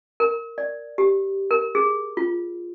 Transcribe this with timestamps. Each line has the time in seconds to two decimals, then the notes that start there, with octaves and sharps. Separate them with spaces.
0.20 A#4
0.58 D5
0.98 G4
1.51 A#4
1.75 G#4
2.17 F4